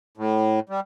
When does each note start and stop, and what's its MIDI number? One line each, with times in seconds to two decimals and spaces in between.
0.17 0.60 45
0.69 0.80 55